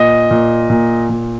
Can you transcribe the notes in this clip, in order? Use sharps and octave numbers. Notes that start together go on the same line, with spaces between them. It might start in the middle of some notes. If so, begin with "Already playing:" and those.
Already playing: A#2 D#5
A#2
A#2
A#2